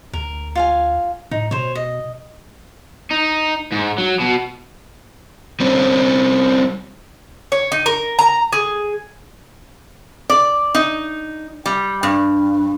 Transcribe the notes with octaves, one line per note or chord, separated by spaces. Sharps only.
D2 A#4
F4 F5 G#5
A2 D#4
B2 C5 C#5
D#5
D#4
G#2
F#3
B2
G3 C4 C#4
C#5
D#4
A#4
A#5
G#4
D5
D#4
G3
G2